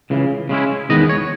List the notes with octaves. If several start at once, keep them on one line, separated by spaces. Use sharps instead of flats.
C#2 C#3 E3
C#3 G#3 C#4 E4
E2 D#3 G#3 B3 D#5
C#5